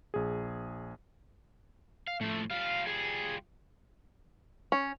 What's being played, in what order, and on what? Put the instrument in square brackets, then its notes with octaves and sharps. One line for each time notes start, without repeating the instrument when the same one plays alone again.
[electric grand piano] A#1 G#4
[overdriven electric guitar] F5
[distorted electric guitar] A2 F3 [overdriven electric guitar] A3
[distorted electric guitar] G3 F4 [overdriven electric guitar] F5
[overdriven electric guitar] G#4
[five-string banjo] C#4